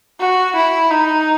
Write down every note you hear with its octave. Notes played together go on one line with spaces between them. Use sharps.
F#4
E4
D#4